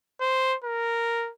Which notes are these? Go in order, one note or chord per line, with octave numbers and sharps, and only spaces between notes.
C5
A#4